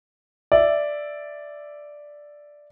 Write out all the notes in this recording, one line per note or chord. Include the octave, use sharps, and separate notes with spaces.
D5 E5